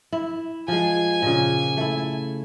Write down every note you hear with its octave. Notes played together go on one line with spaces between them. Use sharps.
E4
F3 G#3 G#5
A#2 C#3
A3 E4